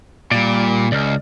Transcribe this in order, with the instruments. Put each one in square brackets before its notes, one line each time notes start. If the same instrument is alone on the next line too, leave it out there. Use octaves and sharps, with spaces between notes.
[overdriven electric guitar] A#2 [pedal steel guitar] G3 D5
[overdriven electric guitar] C#2 [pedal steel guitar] D5 D#5 F6